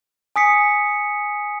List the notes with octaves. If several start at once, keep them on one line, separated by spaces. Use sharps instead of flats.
G#5 D#6 B6 C#7